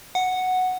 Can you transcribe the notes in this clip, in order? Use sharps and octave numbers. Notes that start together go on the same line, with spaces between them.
F#5